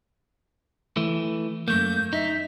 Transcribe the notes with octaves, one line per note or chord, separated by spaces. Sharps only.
E3 A3
F#2 A3 A#3 G6
D#4 E5